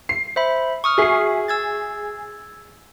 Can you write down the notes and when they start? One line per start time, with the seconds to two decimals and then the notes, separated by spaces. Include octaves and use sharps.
0.09 C7
0.36 C5 E5 B5
0.84 C#6 D#6 F6
0.98 F#4 G#4 E5 C7
1.48 E6 G#6 A6